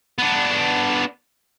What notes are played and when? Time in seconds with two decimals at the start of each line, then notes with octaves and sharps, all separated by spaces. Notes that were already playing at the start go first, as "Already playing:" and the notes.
0.19 B3 D4